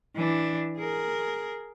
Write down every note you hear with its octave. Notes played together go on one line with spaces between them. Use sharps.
E3 D4
G#4 A#4